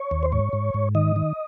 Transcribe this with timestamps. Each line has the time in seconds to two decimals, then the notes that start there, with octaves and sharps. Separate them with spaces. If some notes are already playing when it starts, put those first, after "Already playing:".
Already playing: C#5
0.11 D#2
0.23 C5
0.32 G#2 C#5
0.53 G#2
0.74 G#2
0.95 D#3 D#5
1.16 D#3